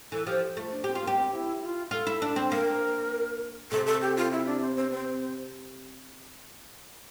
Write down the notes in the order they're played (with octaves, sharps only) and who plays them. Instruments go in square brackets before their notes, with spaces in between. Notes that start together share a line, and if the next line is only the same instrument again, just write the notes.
[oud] E3 [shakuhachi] A4
[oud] F3 [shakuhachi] G4
[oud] A3 [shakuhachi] F4
[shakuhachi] D4
[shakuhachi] C4 [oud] G4
[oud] F4
[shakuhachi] A#3
[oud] G4
[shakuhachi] C4
E4
F4
[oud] F4 [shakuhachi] A4
[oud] E4
D4
C4
[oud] A#3 [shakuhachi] A#4
[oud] C3 [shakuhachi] A4
[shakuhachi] A4
G4
F4
E4
D4
C4
C4
C4